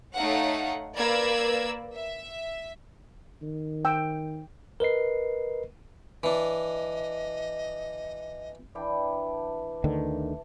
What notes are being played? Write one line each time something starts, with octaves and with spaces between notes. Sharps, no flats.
A3 D#4 C#5 F5 F#5
A#3 A#4 B4 D5 E6 G#6
E5
D#3
G5 E6
A#4 B4 D#5 C7
E3 D4 D#5
E3 D4 G5
D2 D3 D#3